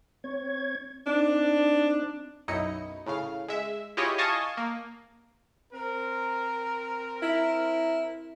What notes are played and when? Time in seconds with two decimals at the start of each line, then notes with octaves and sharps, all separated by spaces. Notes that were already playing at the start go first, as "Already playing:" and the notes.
0.24 C4 C#5 G#6
1.07 C4 D4 D#4
2.48 B1 F#2 D#4 E4 D#5 C#7
3.06 A2 C#3 F5
3.48 G#3 E5
3.97 E4 F4 G4 G#4 C#5 D#5
4.18 D#5 F5 G#5 A5 C#6 D#6
4.57 A#3
5.73 C4 A#4
7.22 E4